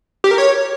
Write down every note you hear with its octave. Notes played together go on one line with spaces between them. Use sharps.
G4
A#4
C#5